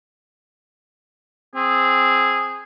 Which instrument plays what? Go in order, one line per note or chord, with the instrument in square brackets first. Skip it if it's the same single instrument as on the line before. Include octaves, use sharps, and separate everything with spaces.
[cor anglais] C4 [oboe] G#4